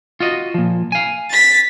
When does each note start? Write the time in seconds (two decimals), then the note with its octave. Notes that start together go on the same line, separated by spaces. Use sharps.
0.20 F4 F#4 D#5
0.54 A#2 F3
0.92 F5 G#5
1.30 A6 B6